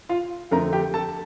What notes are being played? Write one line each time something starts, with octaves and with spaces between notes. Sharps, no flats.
F4 F5
F2 D3 A3 C4 A#4 A#5
G4 G5
A4 A5